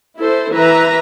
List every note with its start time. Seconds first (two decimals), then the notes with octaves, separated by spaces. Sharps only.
0.17 E4 A4 C5
0.52 E3 B4 E5 A#5